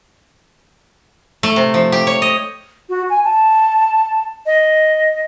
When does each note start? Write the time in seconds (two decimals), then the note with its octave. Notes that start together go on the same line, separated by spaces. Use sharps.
1.43 A3
1.56 C3
1.74 F3
1.92 G4
2.07 C#5
2.22 D#5
2.89 F#4
3.10 G#5
3.24 A5
4.46 D#5